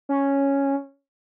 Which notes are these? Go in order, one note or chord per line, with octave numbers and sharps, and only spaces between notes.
C#4